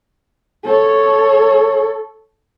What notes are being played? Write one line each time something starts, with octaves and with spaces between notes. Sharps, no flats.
A4 C#5